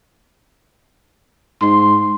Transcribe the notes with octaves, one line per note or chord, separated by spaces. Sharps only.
G#2 C6